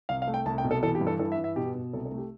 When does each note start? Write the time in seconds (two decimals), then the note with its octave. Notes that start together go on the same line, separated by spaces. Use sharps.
0.09 C2 F5
0.22 F5
0.27 A3
0.34 G5
0.46 C2 A5
0.58 G5
0.64 B2
0.71 A4
0.83 E3 A4
0.95 G4
1.01 G2
1.07 A4
1.19 E3 A4
1.32 E5
1.38 G2
1.44 E5
1.56 B2 G4
1.75 B2
1.93 C2 A4
2.05 A4
2.12 A3
2.18 G4